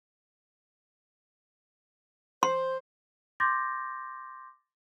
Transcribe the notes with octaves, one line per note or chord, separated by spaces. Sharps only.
C5 C6
C6 D6 G6 A6 A#6